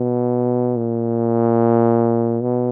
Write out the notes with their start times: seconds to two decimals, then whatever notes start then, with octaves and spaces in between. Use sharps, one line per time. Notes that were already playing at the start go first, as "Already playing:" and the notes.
Already playing: B2
0.77 A#2
2.41 B2